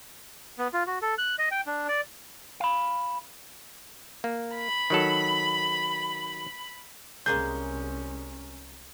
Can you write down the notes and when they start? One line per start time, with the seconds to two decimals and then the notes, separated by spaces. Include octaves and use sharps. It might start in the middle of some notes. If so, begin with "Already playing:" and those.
0.59 B3
0.73 F4
0.87 F#4
1.02 A4
1.18 F#6
1.39 D#5
1.51 G5
1.67 D4
1.88 D5
2.60 F5 B5
4.24 A#3
4.54 B5
4.90 D#3 F#3 A4
7.26 C2 G#3 A#3 C#4 G#4 G6